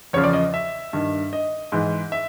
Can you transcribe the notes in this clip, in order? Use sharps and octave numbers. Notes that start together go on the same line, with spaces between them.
E2 C#3 F3 C#5
D5
D#5
E5
G2 D#3
D#5
G#2 E3
E5